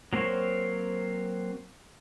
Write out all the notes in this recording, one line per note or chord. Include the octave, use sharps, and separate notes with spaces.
F#3 A#3 C4 C5 C#5